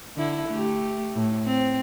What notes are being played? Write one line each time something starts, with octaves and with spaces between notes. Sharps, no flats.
D3 E4
A3 G4
A2
C4